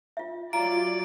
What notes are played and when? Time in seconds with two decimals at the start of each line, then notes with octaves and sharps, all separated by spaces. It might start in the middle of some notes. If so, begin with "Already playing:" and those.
0.17 F4 E5
0.53 F#3 F4 D5 A#5 B5 D7